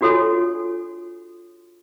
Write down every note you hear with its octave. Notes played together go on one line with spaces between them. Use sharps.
D4 F4 F#4 A4 C#5 G#5